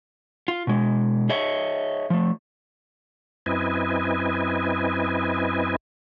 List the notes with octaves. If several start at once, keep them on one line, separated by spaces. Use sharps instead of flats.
F4
B2 G#3
G#4 C#5 D#5 E5
F3 A3
F#2 C4 E4 B4 D#5 G#5